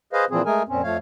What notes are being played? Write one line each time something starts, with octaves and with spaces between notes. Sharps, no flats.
G#4 B4 C5 D#5 F5
A#2 E3 F3 C4 G#4
G#3 A3 G#4 A#4 G#5
F2 A#2 C4 C#4
F2 F3 A3 C#5 F5